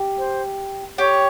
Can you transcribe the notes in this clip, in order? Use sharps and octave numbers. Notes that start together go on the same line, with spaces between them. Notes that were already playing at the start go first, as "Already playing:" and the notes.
Already playing: G4
C5
G4 C#5